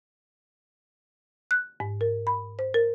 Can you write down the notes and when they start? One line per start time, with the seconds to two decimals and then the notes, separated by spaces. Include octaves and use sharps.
1.51 F#6
1.80 G#2
2.01 A#4
2.27 B5
2.59 C5
2.74 A#4